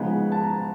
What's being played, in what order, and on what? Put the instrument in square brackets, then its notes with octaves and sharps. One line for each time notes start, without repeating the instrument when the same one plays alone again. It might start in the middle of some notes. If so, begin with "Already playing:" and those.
Already playing: [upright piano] C#3 F3 G#3 B3 D#4 B5
A5
A#5